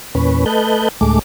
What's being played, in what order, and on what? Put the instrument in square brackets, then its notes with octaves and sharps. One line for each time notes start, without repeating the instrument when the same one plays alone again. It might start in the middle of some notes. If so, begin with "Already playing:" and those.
[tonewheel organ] E2 A#2 C#4 B4
A3 A4 B4 D#5 F#6 G6
D2 A2 G#3 A3 D6